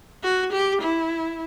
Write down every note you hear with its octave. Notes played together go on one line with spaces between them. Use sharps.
F#4
G4
E4